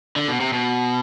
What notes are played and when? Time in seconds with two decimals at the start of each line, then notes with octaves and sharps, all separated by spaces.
0.16 D3
0.28 B2
0.40 C3
0.53 B2